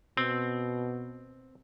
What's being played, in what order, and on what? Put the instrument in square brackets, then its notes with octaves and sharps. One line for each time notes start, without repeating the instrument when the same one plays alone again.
[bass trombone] B2 [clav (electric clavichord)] C4